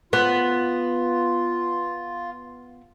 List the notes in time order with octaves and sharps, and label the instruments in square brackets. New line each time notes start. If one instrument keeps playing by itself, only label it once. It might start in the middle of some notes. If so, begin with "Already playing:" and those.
[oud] B3 [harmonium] F4